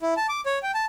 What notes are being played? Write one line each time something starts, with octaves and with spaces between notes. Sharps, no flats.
E4
A5
D6
C#5
G5
A5